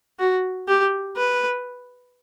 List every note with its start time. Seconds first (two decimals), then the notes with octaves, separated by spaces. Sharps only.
0.19 F#4
0.68 G4
1.17 B4